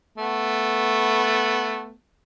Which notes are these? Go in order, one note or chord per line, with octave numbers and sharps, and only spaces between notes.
A3 B3